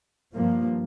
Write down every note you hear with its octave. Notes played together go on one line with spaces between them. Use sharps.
G2 F3 A#3